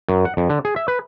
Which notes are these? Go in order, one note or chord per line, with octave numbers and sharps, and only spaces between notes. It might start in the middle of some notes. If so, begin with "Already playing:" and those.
F#2
F#5
F2
D3
G#4
E5
B4